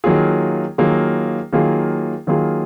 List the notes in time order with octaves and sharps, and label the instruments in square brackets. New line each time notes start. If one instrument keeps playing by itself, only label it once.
[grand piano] D#3 F#3 A#3 F4 G#4
D#3 F#3 A#3 F4 G#4
D#3 F#3 A#3 F4 G#4
D#3 F#3 A#3 F4 G#4